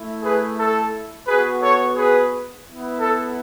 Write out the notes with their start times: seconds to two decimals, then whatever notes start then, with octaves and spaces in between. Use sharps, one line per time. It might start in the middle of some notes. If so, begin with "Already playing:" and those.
Already playing: A3 E4
0.23 G#4 B4
0.57 A4
1.27 B3 F#4 G#4 B4
1.61 A4 C#5
1.96 G#4 B4
2.65 B3 E4
3.00 A4